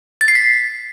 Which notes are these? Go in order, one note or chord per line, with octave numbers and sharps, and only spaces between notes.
A6
C7
B6